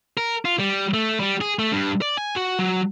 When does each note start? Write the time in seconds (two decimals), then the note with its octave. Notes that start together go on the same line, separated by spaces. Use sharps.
0.17 A#4
0.45 F4
0.59 G3
0.94 A3
1.20 G3
1.41 G#4
1.59 A3
1.72 G2
2.02 D5
2.17 G#5
2.36 F#4
2.59 F#3